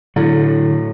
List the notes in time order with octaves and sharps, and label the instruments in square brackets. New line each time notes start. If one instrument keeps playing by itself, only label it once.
[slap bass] A2 F#3 [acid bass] D3 [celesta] E4